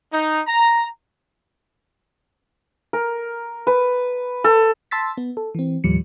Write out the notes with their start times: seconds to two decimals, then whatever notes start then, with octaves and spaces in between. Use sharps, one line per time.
0.11 D#4
0.47 A#5
2.93 A#4
3.67 B4
4.44 A4
4.91 A5 C6 E6 A6 B6
5.17 B3
5.37 A4
5.55 E3 C4
5.84 D#2 A2 F3 G3 C#7